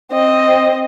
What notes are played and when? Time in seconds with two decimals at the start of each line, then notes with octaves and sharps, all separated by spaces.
0.12 C4 D#5